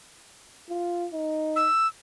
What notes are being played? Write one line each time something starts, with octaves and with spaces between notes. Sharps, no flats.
F4
D#4
E6